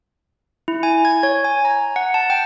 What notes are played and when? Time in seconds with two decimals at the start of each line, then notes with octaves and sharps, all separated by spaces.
0.68 E4
0.83 G#5
1.05 G#6
1.23 C#5
1.45 G#5
1.65 A#5
1.96 F#5
2.14 A5
2.30 G5